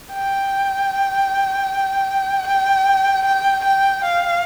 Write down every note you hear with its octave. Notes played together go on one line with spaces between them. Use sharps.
G5
G5
G5
G5
F5